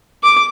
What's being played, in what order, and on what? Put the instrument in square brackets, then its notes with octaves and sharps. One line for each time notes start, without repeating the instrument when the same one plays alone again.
[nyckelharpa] D6